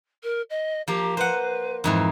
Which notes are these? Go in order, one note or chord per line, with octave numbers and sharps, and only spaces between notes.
A#4
D#5
F3 A#3 G4
B4 C5 F#5
F2 G#2 E3